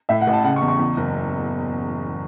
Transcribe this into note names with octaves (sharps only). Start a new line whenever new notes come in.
A2 E5
F#5
A1
A5
C#3 F#5
C#6
E2
C#6
E2
F#1